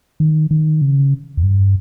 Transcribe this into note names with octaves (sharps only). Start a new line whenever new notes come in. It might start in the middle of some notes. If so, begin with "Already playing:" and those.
D#3
D#3
C#3
E2
G2